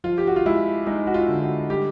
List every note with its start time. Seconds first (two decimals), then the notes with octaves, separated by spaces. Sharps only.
0.04 F3 F4
0.18 G4
0.27 F#4
0.36 F4
0.46 G#3 E4
0.86 G#3 D#4
1.07 F#4
1.14 F4
1.28 D3
1.42 F#4
1.70 G3 G4